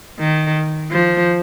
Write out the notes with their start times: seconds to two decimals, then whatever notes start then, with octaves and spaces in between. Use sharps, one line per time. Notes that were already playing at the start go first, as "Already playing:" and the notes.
0.19 D#3
0.91 F3